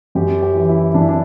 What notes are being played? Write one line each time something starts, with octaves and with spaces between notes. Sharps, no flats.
F#2 G4
G4
E3
E4
F#2 D4
E4
D4